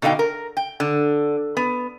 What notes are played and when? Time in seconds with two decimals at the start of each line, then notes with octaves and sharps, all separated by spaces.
0.02 B2 D3 D#4 F5 G5
0.19 A#4
0.57 G5
0.80 D3
1.57 B3